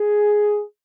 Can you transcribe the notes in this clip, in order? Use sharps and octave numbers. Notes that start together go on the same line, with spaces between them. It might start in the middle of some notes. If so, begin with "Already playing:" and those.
Already playing: G#4